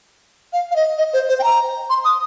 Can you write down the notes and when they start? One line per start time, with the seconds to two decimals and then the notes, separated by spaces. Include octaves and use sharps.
0.53 F5
0.71 F5
0.76 D#5
0.98 D#5
1.13 C5
1.29 C5
1.39 G5
1.44 A#5
1.90 C6
2.05 D#6